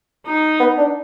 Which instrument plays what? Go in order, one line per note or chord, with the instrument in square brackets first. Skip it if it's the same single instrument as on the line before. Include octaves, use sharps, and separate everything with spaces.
[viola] D#4
[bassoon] B3
D4